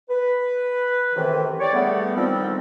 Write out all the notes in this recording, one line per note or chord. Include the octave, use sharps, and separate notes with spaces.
B4
F#2 A2 C3 D#3 E3
G4 C#5 D5
E2 G#2 D3 G3 A3 B3
D3 D#3 F3 G3 B3 C4